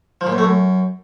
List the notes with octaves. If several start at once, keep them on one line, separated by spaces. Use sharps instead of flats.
F3
A#2
F#2
A3
F#2